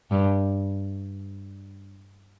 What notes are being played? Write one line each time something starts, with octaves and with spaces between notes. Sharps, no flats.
G2